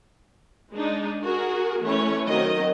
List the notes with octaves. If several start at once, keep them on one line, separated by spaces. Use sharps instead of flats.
G#3 D4 D#4
F#4 G#4 A#4
E3 A3 C#4 C#5
D#3 F#3 C4 D#5